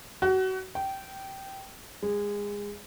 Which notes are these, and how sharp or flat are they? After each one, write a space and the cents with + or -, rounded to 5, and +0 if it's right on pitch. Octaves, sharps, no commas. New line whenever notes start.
F#4 +30
G5 -15
G#3 -20